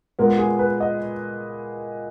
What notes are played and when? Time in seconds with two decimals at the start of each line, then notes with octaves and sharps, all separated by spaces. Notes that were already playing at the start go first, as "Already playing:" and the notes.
0.19 A#2 G#3 B3 A#4
0.39 G#4
0.59 B4
0.80 D#5